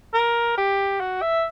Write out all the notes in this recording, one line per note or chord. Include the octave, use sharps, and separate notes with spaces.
A#4
G4
F#4
E5